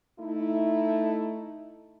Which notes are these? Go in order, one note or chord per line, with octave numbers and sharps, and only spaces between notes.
A3 D#4 E4